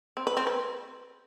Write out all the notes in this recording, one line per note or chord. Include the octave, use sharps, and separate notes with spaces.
C4
B4
C4
B4